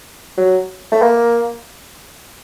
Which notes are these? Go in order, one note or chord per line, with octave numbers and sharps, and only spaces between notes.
F#3
A3
A#3